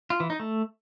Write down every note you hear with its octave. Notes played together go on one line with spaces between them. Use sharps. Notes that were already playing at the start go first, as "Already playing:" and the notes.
F4
E3
D#4
A3